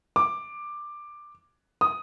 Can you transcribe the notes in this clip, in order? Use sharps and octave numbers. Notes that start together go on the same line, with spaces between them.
D6
D#6